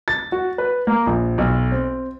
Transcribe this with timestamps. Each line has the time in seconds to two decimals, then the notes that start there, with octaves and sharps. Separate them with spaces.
0.08 A6
0.32 F#4
0.58 B4
0.87 A#3
1.07 A#1
1.38 B1
1.72 C4